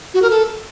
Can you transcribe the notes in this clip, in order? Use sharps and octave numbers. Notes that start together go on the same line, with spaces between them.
F#4
A#4
A4